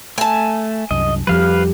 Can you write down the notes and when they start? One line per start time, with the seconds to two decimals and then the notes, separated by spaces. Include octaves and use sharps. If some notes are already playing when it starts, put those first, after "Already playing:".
0.18 A3 G#5 A5
0.91 C2 F#2 D#5
1.27 F2 F3 G3 G4 B4 F5 F6